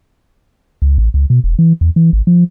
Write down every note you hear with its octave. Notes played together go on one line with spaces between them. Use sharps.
C#2
A1
C#2
B2
E1
E3
E2
E3
G#1
F3